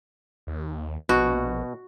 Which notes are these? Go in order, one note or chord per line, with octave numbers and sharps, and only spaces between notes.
D#2
A#1 B2 F#4